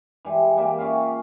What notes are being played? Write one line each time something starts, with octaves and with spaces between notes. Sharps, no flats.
E3 G3 G#3
G3 A#3
C#4 F4 E5 F5